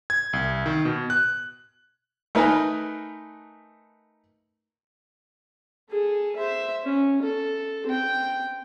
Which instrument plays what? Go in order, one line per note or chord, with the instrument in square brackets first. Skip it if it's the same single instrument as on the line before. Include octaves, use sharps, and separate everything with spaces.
[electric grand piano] G#6
C2
D#3
B2
F#6
[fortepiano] A3 D#4 A#4 B4 G#5 A#5
[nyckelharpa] G#4 A4
C5 E5
C#4
A4
C4 G5